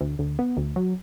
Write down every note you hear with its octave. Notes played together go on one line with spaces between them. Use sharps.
D2
D2
B3
D2
F#3